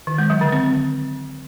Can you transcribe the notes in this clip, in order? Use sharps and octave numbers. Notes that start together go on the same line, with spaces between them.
D#3
G#3
F#3
D3
C4